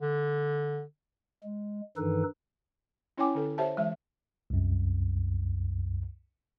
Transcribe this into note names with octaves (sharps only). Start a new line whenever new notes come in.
D3
G#3
G2 D#3 E3 D#4 A4 B4
C#4 E4 C#5 G5 G#5 D6
D3 A4
G4 C5 C#5 E5 F#5 A5
E3 G#3 E5
C2 F#2